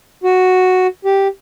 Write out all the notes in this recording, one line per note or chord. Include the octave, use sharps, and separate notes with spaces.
F#4
G4